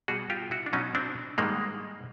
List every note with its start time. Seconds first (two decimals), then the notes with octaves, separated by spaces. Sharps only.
0.08 B2 G3 F#4 G#4
0.30 F4 G4
0.51 E4 F#4
0.66 D4
0.73 B2 F#3 C#4 D#4
0.95 C4 D4
1.38 G#2 D#3 G3 G#3 A#3